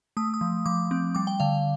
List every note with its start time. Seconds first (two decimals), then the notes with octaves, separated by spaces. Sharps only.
0.17 A3 D#6
0.34 D#6
0.41 F3
0.66 F3 D6
0.91 C4
1.15 G3 D6
1.27 G5
1.40 D3 F5